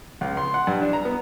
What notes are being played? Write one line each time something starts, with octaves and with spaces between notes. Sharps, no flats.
C#2
C6
F#5
G2
D4
A#5
B3